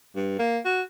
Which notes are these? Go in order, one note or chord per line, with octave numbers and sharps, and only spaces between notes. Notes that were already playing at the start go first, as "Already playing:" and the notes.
G2
A#3
F#4